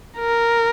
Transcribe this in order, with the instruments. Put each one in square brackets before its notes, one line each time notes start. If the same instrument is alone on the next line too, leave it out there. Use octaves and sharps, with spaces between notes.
[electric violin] A#4